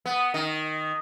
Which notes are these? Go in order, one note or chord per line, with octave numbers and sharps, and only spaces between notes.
B3
D#3